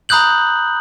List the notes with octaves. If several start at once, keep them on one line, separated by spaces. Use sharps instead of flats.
A#5 B5 D#6 F#6 G6 F#7